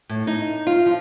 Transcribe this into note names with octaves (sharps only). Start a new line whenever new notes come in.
A2
D#4
F4
F3